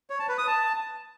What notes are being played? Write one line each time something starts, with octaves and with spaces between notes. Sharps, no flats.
C#5
A5
B4
D#6
A5